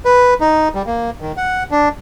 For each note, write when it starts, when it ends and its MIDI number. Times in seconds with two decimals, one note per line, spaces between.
0.05 0.34 71
0.41 0.68 63
0.75 0.82 55
0.86 1.10 58
1.21 1.32 51
1.37 1.63 78
1.71 1.89 62